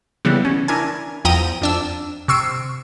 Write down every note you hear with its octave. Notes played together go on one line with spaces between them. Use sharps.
C#3 E3 G3 B3
C#4
D4 E4 A#4 G#5
E2 F3 G5 A#5 D#6 D#7
F2 D4 E6
C3 C#6 E6 C7 D7